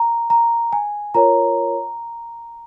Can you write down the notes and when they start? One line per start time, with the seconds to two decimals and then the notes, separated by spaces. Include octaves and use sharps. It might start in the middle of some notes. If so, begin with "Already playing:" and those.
Already playing: A#5
0.30 A#5
0.73 G#5
1.14 F4 A#4 C#5 A#5